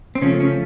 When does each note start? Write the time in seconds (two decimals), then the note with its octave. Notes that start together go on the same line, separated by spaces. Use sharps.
0.15 C4
0.22 C#3 F3 A3 C#4
0.40 C#4